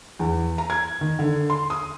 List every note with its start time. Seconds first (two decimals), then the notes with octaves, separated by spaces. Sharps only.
0.19 E2
0.58 A#5
0.70 G#6
1.01 D#3
1.19 D3
1.50 C6
1.70 D#6